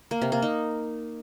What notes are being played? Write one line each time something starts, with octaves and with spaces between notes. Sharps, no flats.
A#3
C3
A#3
D#4